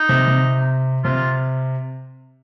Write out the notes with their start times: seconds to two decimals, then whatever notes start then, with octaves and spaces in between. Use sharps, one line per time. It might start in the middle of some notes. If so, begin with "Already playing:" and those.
Already playing: D#4
0.09 C3
0.28 C3
1.04 C3 F4